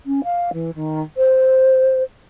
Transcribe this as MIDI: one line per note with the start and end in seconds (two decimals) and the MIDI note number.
0.06 0.23 61
0.24 0.50 77
0.53 0.70 52
0.75 1.02 51
1.17 2.03 72